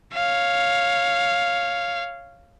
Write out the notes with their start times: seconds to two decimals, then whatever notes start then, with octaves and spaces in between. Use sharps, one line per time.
0.13 C#5 F5